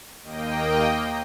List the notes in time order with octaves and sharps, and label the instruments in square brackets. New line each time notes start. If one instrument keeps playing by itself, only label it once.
[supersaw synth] D#2 A#3 D#5 G5